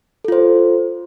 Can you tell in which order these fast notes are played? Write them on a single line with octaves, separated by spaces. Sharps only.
A4 F4 C5